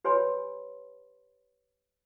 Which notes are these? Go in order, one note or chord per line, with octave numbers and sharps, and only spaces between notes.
G4 B4 C#5 G#5 B5 C6